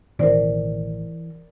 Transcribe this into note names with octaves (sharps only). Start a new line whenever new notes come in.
A1 B2 D#3 E3 A#4 C5 D5